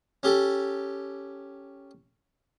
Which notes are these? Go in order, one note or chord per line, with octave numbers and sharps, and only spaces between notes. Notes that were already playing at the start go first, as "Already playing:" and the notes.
C#4 G4 A4